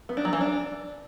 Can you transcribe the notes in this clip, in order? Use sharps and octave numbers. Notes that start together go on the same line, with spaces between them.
B3
D4
F#3
E3
D4